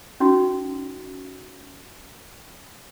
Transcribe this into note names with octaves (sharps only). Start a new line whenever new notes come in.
C#4 D#4 F#4